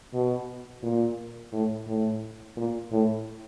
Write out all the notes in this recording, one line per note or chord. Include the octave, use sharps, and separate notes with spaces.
B2
A#2
A2
A2
A#2
A2